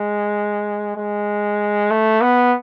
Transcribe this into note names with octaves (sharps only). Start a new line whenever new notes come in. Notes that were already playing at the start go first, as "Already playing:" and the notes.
Already playing: G#3
G#3
A3
B3